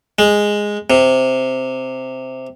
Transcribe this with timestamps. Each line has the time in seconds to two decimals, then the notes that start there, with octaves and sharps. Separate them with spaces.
0.19 G#3
0.90 C3